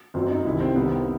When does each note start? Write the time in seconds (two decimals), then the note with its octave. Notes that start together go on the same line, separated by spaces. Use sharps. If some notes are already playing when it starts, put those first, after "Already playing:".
0.14 G1 F#2 F#3 C4
0.30 D#4
0.45 C2 C3 D#3 E4
0.60 C4
0.75 C2 C3 D#3 B3
0.91 C4